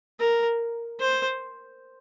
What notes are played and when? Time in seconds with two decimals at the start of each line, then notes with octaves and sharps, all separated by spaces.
0.20 A#4
1.00 C5